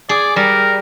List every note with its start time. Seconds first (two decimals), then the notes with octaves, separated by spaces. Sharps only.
0.09 G#4 D5
0.36 G3 A#4